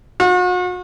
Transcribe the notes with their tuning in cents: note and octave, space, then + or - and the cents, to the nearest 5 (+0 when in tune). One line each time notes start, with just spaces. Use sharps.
F#4 -40